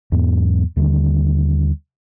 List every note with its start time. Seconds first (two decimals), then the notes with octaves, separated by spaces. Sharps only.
0.12 E2 G#2 F#3 B3
0.76 D#2 D3 G3